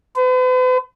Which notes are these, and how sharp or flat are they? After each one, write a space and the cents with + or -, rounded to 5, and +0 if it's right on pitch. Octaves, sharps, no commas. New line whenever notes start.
B4 +45